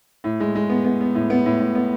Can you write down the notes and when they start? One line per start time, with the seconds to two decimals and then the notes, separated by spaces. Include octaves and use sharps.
0.24 A2
0.40 G#3
0.55 G#3
0.70 B3
0.84 B3
1.01 B3
1.15 A2
1.30 B3
1.46 A2
1.60 A2
1.75 B3